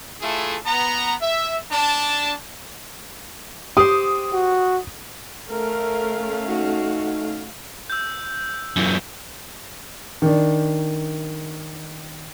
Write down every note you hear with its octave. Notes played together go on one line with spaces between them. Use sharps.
A3 E4 F4 G#4 A4
B3 A#5
E5
D4 A5
G4 C5 D#6
F#4
A3 C#4 A#4 F5
D#4 F#4
E6 G6
F#2 E3
D#3 D4